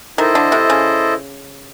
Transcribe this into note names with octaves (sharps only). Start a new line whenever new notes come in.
D#3 E4 A4 C5 D#5
D3
C3
C#3